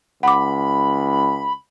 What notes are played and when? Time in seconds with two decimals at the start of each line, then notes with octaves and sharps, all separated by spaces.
0.23 C#2 F#5 B5 D6